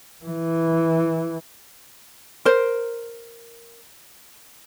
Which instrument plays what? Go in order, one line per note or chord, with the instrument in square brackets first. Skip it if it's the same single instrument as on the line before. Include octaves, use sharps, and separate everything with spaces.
[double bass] E3
[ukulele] A#4 C5